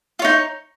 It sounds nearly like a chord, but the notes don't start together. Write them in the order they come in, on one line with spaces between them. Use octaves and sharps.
F4 C#5 D#4